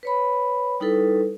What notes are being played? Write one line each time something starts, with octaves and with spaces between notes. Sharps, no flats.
B4 C#5 B5
G3 D#4 E4 A4 B4